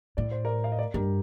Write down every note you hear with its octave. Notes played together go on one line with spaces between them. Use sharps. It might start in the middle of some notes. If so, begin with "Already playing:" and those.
A2 D5
C5
A#4 D5
F5
D#5
A#4 D5
G2 G4 A#4